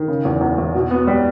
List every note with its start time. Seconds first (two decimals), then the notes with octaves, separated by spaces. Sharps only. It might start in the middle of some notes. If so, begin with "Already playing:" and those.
Already playing: D#3
0.08 C#3
0.25 E2
0.41 E2
0.58 E2
0.74 B2
0.91 B3
1.07 G3